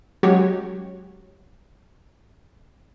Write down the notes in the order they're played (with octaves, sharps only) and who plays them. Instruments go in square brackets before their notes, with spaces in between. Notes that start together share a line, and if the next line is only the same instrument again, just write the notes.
[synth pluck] F#3 G#3 C#4 F#4 G4 C#5